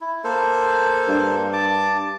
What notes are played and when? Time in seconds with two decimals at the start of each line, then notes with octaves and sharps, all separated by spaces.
0.01 E4
0.24 A#3 A4 C5
1.08 G2
1.53 A5 D6